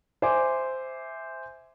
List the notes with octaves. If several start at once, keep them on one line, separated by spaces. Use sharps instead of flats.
C5 E5 G#5 D6